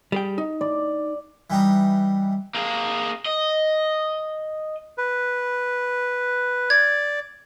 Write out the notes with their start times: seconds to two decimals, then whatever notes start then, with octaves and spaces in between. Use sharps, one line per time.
0.12 G3 G#4 G5
0.38 D#4
0.61 D5
1.50 E3 G3 D#4
2.55 A#3 G#4
3.26 D#5
4.98 B4
6.70 D5 G#6